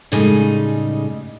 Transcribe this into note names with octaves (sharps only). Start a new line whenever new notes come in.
A2 C#3 G3 G#3 D#4